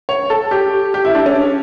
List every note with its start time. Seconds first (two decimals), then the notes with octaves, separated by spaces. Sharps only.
0.09 C#5
0.30 A4
0.51 G4
0.94 G4
1.05 E4
1.15 D4
1.26 C#4